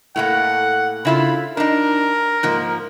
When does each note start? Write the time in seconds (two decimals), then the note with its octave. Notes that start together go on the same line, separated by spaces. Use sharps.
0.16 A2 A3 A#3 F#5
1.05 C#3 E4 F4 B5
1.57 D4 D#4 A#4
2.43 G#2 F3 A#3